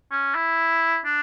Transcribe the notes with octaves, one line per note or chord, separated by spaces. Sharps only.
C#4
E4
D4